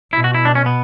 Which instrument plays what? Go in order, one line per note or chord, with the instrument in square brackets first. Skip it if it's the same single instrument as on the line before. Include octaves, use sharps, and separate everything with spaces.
[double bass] B2 [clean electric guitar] E4
[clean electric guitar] F#4
E4
D4
C#4
B3